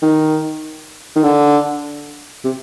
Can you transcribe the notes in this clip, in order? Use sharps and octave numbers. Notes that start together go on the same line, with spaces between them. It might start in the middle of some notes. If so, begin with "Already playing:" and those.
D#3
D#3
D3
C3